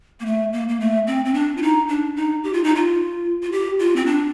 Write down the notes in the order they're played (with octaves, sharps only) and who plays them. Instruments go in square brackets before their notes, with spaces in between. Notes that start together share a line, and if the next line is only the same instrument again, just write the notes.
[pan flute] A#3
A3
A#3
A#3
A3
C4
C4
D4
F4
D#4
D4
D#4
G4
F4
D#4
F4
F4
G4
F4
C4
D4